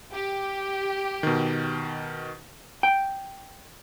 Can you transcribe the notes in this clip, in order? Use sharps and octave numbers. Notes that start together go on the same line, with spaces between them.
G4
B2 D#3
G5